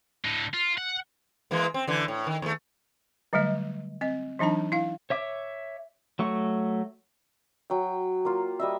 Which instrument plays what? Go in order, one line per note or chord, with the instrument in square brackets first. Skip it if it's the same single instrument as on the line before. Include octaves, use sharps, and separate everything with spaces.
[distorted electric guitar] A2 D3
F4
F#5
[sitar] E3 G#3 A#3
C4
D3 E3
A2
D#3
D#2 A3
[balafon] D3 F#3 G3 A3 D#5
C4 D#5
E3 F#3 D4 D#4 A5
E4 F5
[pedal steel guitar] C#5 E5 D6
F#3 A3 C#6
[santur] F#3 G5
A#3 F4
G3 D#5 E5